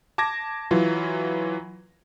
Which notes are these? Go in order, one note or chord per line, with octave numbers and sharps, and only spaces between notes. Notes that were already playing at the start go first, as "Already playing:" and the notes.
A5 D6 G#6 A#6
E3 F#3 F4